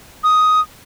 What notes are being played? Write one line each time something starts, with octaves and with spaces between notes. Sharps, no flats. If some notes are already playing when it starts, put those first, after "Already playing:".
D#6